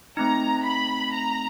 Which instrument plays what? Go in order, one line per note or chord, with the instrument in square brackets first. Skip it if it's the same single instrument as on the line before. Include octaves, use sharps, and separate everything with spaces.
[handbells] A3 C4 D#4 [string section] A#5
[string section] B5
A#5